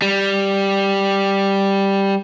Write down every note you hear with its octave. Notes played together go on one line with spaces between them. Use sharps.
G3